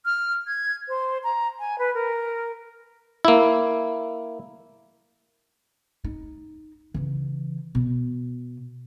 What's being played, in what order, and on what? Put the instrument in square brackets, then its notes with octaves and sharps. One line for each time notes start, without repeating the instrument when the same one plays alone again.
[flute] F6
G#6
C5
A#5
G#5
B4
A#4
[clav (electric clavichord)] A#3 E4
[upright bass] D#4
C#3 E3
B2